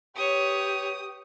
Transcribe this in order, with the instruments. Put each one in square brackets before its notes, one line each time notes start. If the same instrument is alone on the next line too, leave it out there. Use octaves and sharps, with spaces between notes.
[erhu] G4 [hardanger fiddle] B4 C#5 [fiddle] D#6